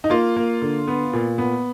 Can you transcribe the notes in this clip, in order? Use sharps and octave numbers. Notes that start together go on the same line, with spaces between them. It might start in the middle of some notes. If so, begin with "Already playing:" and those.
D#4
A#3 F4
A#3
D3
B3
A#2
B3